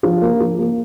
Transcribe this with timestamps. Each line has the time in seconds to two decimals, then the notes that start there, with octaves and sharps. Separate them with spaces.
0.03 F3
0.22 A#3
0.40 F3
0.59 A#3